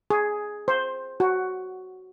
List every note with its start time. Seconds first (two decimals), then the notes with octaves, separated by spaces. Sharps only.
0.10 G#4
0.68 C5
1.20 F#4